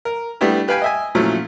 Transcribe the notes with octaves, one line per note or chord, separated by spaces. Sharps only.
A#4
G3 A3 B3 D4 E4 G4
G4 B4 F5 G5 G#5
D#5 E5 G#5
A#2 F3 F#3 A3 C#4 E4